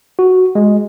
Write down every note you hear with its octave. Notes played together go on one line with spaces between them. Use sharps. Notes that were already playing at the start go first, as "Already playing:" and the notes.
F#4
G#3